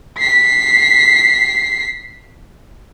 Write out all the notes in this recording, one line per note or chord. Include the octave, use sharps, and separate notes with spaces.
B6 C7